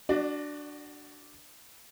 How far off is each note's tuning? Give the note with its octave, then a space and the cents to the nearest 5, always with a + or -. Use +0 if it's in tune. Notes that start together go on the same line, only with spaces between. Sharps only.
D4 +0 F#4 +15 D5 +40